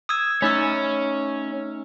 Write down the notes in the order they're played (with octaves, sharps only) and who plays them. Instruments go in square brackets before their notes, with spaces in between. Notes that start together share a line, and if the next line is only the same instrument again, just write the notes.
[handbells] D#6 E6 G#6
[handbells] A3 D#4 E6 [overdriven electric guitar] C#4